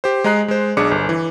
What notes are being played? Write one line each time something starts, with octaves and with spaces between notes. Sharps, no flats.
G4 C5
G#3 D#5 A#5 F#6 C7
G#3 C5
B1 D4 G#4 D6 C#7
G1
E3